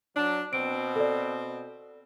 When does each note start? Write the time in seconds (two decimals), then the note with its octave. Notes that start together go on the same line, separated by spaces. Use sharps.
0.17 F#3 D4 A5
0.53 B2 C4 D7
0.96 A4 D5